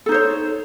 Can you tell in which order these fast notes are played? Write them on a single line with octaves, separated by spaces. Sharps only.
A4 D#4 C5 C#5